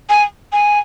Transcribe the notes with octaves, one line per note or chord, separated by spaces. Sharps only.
G#5
G#5